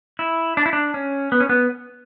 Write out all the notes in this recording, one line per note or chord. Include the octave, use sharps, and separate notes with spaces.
E4
D4
E4
D4
C#4
B3
C#4
B3